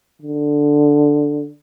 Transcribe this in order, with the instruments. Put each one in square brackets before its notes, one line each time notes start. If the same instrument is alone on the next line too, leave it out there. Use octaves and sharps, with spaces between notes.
[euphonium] D3